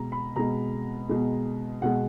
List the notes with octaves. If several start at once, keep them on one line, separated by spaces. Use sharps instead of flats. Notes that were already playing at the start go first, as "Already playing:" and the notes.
Already playing: B2 G#3 A#5
B5
B2 G#3 A#5
B2 G#3
B2 G#3 F#5